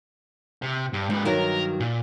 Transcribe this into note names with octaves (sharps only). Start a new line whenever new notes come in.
C3
G2
G#2 D#4 B4
G2 D#3 F#3 A#4
A#2